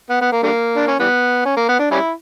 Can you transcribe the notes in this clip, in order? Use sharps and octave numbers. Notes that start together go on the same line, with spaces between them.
B3
B3
A#3
D3 G3 A#3
D4
C#4
E3 G3 B3
C#4
A#3
B3
D4
G3 C#4 E4